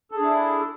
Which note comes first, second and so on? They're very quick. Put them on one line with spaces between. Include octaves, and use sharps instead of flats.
A4 G#4 D4 E4